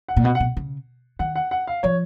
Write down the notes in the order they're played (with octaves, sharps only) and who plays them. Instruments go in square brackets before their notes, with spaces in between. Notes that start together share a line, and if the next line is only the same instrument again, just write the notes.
[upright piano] F#5
[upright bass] A#2
[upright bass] B2 [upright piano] F#5
[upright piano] F#5
[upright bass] B2
C#3
[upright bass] D#3 [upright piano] F#5
[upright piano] F#5
F#5
F5
[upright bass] F3 [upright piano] C#5